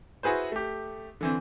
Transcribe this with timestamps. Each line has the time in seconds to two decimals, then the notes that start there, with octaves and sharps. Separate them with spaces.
0.23 E4 F#4 G#4 B4 C5
0.52 A3 G4
1.21 D3 E3 C4